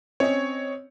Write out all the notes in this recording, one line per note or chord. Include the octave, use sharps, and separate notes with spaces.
C4 C#4 C#5 D#5